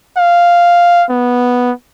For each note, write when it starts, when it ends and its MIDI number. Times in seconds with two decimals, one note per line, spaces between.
0.17 1.05 77
1.10 1.71 59